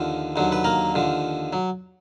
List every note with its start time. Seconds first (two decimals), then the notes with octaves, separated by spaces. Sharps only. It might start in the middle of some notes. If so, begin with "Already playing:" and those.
Already playing: D#2 D3 F3
0.36 D#2 D3 F#3
0.52 B4
0.64 A#3 A#4
0.94 D#2 D3 F3
1.53 F#3